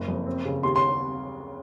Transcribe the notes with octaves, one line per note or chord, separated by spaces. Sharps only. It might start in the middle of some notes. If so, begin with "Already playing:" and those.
Already playing: F#1
F2
C4
C#3
D#2 C6
C6